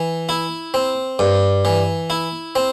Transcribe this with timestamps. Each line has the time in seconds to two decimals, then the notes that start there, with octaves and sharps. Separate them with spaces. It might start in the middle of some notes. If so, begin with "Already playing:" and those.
Already playing: E3
0.29 E4
0.74 C4
1.19 G2
1.65 E3
2.10 E4
2.56 C4